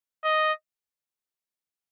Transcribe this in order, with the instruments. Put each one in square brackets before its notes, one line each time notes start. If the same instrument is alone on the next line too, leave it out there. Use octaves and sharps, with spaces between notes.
[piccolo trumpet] D#5